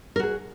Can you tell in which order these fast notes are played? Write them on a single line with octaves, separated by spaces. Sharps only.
A#4 F#4 G#4